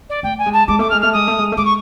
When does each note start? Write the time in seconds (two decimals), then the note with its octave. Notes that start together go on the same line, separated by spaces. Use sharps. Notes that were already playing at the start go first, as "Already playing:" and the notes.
0.09 D5
0.23 A3 G5
0.38 G#5
0.46 G#3
0.53 A5
0.67 G#3 D6
0.79 A3 D6
0.90 G#3 F6
1.01 A3 F6
1.13 G#3 D#6
1.28 A3
1.38 G#3
1.52 A3
1.57 G#3 D6
1.65 C#6